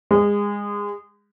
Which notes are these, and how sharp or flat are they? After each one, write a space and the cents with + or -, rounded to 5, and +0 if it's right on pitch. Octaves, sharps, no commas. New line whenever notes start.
G#3 -25